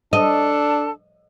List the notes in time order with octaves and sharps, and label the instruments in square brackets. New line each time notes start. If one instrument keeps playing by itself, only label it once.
[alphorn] D4 [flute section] A4 A5 [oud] D#5